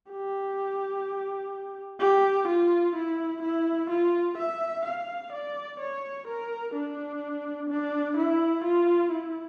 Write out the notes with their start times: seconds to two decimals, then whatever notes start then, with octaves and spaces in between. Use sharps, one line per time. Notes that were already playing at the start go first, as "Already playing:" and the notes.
0.10 G4
1.99 G4
2.48 F4
2.95 E4
3.42 E4
3.90 F4
4.37 E5
4.85 F5
5.32 D5
5.80 C#5
6.27 A#4
6.74 D4
7.69 D4
8.17 E4
8.64 F4
9.11 E4